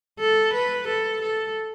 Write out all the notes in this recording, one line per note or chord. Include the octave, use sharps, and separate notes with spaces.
A4
B4
A4
A4